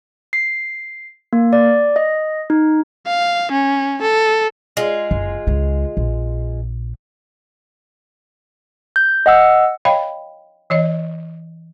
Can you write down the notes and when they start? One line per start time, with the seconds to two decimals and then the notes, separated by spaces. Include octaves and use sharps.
0.33 C7
1.33 A#3
1.53 D5
1.96 D#5
2.50 D#4
3.07 F5
3.52 C#4
4.02 A4
4.77 G#3 F4
5.11 F#1
5.47 C#2 C#3
5.97 A#1
8.96 G6
9.26 D#5 F#5 E6
9.85 C#5 D#5 F5 G5 B5
10.70 E3 C#5 D#5